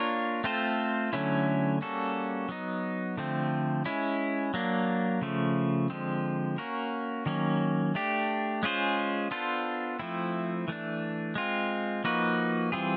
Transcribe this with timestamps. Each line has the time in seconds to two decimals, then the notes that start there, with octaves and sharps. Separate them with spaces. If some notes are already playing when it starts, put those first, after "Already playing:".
Already playing: A#3 D4 F4 A#4 C#5
0.44 A3 C4 F4 A4 C5
1.13 D3 F#3 A3 C#4 E4
1.81 G3 A#3 C#4 F#4 A4
2.49 F#3 B3 D#4
3.17 D3 F3 A3 C4
3.85 G#3 C#4 E4
4.54 F#3 A#3 D4
5.22 C#3 F3 A3
5.90 D3 F3 G#3 C4
6.58 A#3 C#4 F#4 A#4
7.26 D#3 F#3 A#3 C#4
7.95 A3 D4 G4
8.63 G#3 C#4 F4 G#4 C5
9.31 B3 D4 F4 A4 C5
9.99 F3 A3 C4 E4
10.68 E3 A3 D4
11.35 G#3 C4 F4
12.04 F3 A#3 D#4 F#4 B4
12.72 E3 G3 C4 F4 G#4